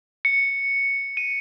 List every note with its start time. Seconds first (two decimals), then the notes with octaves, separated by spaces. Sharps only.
0.25 C#7
1.17 D#7